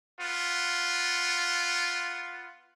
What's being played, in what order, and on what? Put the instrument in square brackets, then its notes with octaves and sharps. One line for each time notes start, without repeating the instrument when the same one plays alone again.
[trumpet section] B3 F4